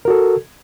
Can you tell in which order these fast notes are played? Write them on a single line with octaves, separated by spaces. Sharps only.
A#4 F#4 A4